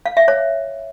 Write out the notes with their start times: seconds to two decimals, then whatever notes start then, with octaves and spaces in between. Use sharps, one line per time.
0.06 F5
0.17 E5
0.28 C#5